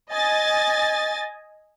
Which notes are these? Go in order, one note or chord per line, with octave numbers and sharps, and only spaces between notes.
D#5 G#5 A6